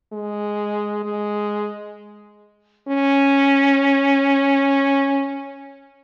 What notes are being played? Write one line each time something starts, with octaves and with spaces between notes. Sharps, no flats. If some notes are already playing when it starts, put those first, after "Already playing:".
G#3
G#3
C#4